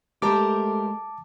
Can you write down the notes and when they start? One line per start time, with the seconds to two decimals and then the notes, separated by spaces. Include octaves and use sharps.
0.22 G#3 A3 G4 A#4 C5 A5 D6